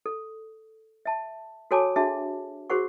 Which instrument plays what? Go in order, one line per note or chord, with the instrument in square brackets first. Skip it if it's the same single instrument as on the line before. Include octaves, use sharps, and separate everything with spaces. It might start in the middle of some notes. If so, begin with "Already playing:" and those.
[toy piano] A4
E5 A5
F#4 A4 C#5 G#5 A5 D6
D4 F#4 G#4 E5 A5
F#4 G#4 A#4 C5 F#5 C#6